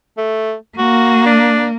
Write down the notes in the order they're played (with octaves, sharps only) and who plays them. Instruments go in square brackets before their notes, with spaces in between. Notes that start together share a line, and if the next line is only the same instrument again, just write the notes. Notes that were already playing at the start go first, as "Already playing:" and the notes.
[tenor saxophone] A3
[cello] A#3 [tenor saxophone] F#4
[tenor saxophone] D4